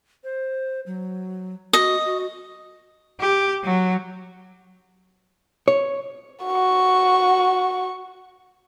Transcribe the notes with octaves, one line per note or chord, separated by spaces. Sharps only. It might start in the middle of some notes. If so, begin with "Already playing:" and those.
C5
F#3
F#4 D#5
F#4
G4
F#3
C#5
F#4 C#6